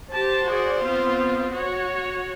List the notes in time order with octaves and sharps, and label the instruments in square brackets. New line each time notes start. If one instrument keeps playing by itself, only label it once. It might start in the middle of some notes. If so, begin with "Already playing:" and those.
[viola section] G4 A5 [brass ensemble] C5
[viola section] F#4 G#4 D5
B3 C4 F4
F#4 C#5